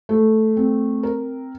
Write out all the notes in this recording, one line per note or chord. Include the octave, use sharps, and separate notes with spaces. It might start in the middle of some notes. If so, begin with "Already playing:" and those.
A3
C4
A#4